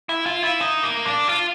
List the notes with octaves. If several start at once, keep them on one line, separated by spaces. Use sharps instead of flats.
E4
F4
E4
D#4
A#3
D4
F4